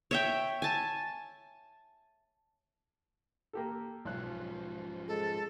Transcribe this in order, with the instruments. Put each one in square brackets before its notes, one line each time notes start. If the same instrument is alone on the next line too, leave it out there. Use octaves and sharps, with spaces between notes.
[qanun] C#5 E5 G5
G#5 A5
[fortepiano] A#3 G4 A4
[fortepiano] B1 F#6 [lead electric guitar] G#2 F3
[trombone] G#3 [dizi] A4